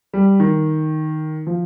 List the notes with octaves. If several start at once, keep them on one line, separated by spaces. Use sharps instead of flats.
G3
D#3
F3